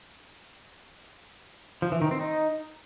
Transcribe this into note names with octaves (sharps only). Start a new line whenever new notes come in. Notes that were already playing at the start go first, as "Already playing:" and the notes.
F3
E3
D#3
C4
D#4